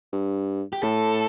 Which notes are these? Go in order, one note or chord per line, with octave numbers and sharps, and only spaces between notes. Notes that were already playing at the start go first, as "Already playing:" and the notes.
G2
G4
A2 A4